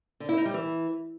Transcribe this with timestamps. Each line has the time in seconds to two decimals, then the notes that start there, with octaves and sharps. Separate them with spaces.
0.20 D3
0.29 E4
0.37 D#4
0.45 G3
0.54 E3